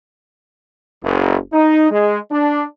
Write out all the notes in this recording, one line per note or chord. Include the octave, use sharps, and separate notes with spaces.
F#1
D#4
G#3
D4